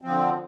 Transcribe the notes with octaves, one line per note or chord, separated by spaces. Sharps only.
D3 F3 C4